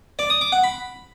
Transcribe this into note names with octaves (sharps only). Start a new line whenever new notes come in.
D5
D#6
D6
F#5
B5